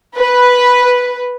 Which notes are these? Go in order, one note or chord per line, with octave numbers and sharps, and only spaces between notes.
B4